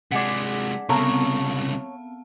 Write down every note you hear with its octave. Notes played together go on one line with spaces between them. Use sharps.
C3 G#3 D4 G#4 F#5 B6
C2 C#3 B3 C4 C#5 A5 A#5